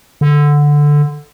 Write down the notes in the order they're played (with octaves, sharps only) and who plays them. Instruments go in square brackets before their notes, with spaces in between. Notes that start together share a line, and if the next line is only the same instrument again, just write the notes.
[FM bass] D3